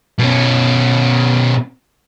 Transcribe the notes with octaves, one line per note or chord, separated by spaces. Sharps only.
B2 C#4